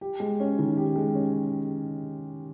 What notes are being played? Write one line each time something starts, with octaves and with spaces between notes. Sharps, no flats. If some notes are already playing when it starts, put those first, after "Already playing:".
G4
G#3
C#4
D#3
G4
G#3
C#4